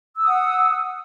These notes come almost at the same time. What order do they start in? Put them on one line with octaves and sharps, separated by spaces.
E6 D#6 F#5